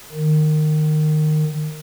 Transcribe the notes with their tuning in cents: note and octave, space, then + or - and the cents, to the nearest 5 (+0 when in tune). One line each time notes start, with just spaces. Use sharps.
D#3 -20